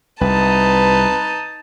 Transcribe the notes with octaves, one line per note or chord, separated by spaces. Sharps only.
C2 D#4 B4 A5